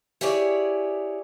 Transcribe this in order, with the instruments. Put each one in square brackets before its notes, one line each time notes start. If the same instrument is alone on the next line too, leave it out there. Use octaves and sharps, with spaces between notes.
[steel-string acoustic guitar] E4 G4 G#4 C#5 D5